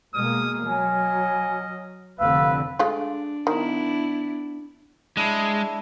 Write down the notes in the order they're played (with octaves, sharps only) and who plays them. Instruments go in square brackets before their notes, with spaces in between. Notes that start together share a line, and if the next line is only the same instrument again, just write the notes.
[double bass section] B2 G#3 A#3 [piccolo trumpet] D#6 [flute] F6
[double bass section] F#3 [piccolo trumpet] D#5 [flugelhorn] G#5
[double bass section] F1 D3 C4 [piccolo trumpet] B4 [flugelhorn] F5 [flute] E6
[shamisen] G#3 A3 F4 [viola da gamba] D4
[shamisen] D#3 [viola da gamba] B3 D4 E4
[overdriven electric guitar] G#3 [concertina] D4 E4